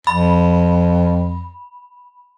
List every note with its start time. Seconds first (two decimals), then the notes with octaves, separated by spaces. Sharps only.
0.07 F2 B5